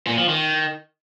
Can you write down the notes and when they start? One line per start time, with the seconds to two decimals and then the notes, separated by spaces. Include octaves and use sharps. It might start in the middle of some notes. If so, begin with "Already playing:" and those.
0.07 A#2
0.18 F3
0.29 D#3